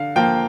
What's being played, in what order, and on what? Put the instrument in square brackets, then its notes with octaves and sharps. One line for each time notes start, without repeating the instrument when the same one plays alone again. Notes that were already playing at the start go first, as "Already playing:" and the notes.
Already playing: [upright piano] D3 F5
F3 A#3 G5